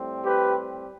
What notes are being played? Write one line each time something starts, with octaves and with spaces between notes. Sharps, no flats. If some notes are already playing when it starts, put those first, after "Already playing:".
Already playing: A2 G3 C4
G4 B4